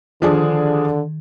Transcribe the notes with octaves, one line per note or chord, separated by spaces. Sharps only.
D3 D#3 F3 D4 G#4